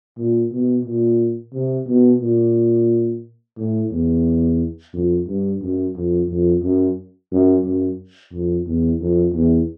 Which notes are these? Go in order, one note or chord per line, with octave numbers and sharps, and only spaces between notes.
A#2
B2
A#2
C3
B2
A#2
A2
E2
F2
G2
F#2
F2
F2
F#2
F#2
F#2
F2
E2
F2
E2